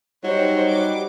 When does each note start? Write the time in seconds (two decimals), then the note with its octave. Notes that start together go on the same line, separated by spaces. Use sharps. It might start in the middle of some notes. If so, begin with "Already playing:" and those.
0.24 F#3 G3 D#4 C5 C#5
0.71 D6